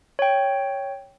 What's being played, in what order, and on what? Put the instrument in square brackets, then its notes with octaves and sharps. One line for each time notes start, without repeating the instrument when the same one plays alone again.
[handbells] C#5 G5